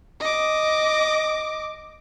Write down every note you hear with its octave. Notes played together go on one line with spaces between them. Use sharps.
D#5 D6